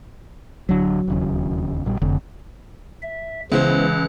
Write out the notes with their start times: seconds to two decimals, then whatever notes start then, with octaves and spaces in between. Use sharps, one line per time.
0.69 D1 D3 F#3
1.08 E1 D#2 C#3
1.85 A#1 A#2 G3
2.02 F1 D3 C4
3.03 E5
3.52 C#2 C#3 E3 B3 E4 C5 F#6